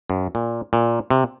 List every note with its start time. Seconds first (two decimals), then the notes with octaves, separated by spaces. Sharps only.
0.10 F#2
0.35 A#2
0.73 A#2
1.11 C3